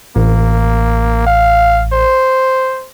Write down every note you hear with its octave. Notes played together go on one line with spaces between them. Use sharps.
A1 A#3
F5
C5